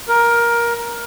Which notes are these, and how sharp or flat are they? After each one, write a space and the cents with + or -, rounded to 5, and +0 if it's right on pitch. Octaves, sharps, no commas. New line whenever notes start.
A#4 +15